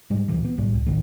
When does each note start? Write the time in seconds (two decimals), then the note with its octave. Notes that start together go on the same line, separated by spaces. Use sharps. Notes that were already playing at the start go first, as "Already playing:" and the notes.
0.10 G#2 G3 G#3
0.28 D1 G#1 A#2 E3
0.45 B3
0.57 B1 A2 G3
0.74 C#2
0.87 A#1 A2 D#3 A3